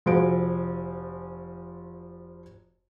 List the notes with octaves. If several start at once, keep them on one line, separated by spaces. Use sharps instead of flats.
F1 F3 F#4 G#4 D7